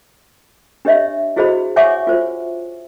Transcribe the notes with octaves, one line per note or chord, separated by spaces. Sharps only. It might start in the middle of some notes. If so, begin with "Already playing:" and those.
D4 G4 C#5 D#5 E5
E4 F#4 G#4 C5 D#5 B5
C#5 E5 F#5 G#5 C#6 D6
F4 C5